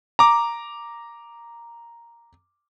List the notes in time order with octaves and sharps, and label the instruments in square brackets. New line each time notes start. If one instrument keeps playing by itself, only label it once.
[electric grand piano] A#5 D6